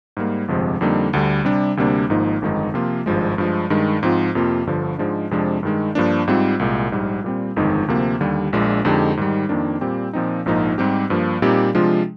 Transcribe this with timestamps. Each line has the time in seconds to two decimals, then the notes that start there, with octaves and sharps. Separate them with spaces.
0.17 G#2 G3 A#3
0.48 G1 F2 C3 F3 G#3
0.81 F2 D3 G3 A#3 D#4
1.13 D2 D3 G3
1.45 C3 G3 D4
1.77 D2 C3 G3 A#3 D4
2.09 G#1 G#2 F3 A#3 D#4
2.42 G1 F2 D#3 G#3 D#4
2.74 C3 F3 A#3 F4
3.06 G#1 G2 F3 G#3
3.38 G2 F3 G#3
3.70 G2 D#3 G#3
4.03 G#2 F3 C4 F4
4.35 F2 C3 F3 A#3 F4
4.67 G1 G2 D3 F3
4.98 G#2 F3 G#3 D4
5.31 F2 C3 F3 G#3 D4
5.63 G2 D#3 G#3
5.95 G2 F3 A#3 D4
6.28 G#2 G3 C4 F4
6.59 C2 A#2 G#3
6.92 A#1 G#2 G3
7.24 A#2 G3 C4
7.56 G1 F2 D#3 G#3 D#4
7.88 D2 C3 F3 A#3
8.21 D#2 D3 G3
8.53 A#1 A#2 G#3 D4
8.85 F2 D3 G#3 D#4 G4
9.17 G#2 D#3 G3
9.49 F2 D#3 A#3 D4
9.81 A#2 G3 C4 G4
10.13 A#2 F3 C4 D#4
10.46 A#1 G#2 F3 A#3 D#4
10.78 G#2 G3 C4 G4
11.10 G2 F3 A#3
11.42 A#2 G3 C4 D#4 G4
11.75 C3 F3 G#3 D4 F4